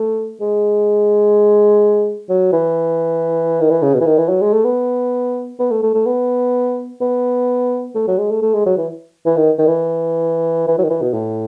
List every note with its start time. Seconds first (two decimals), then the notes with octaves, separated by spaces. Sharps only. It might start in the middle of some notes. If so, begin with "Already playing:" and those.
Already playing: A3
0.41 G#3
2.29 F#3
2.53 E3
3.61 D#3
3.71 E3
3.83 C#3
3.94 B2
4.01 E3
4.06 D#3
4.18 E3
4.29 F#3
4.42 G#3
4.53 A3
4.65 B3
5.60 B3
5.71 A3
5.83 A3
5.95 A3
6.06 B3
7.01 B3
7.95 A3
8.08 F#3
8.19 G#3
8.31 A3
8.42 A3
8.54 G#3
8.66 F#3
8.78 E3
9.26 E3
9.37 D#3
9.59 D#3
9.68 E3
10.68 E3
10.79 F#3
10.84 D#3
10.90 E3
11.02 B2
11.14 A2